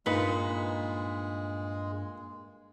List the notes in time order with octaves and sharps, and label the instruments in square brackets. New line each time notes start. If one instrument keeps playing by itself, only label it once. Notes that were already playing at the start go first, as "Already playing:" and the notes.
[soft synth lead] G2 [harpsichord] A#2 [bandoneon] G#3 [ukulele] D#4 B4